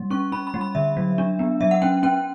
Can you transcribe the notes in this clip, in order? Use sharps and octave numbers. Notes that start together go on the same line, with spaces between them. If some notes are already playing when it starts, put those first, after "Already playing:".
Already playing: G3
C#4 C#6
C#4 B5
B5
G3
B5
D3 E5
F#3
D4
B3
F#3 E5
F#5
C#4 G5
C#4 G5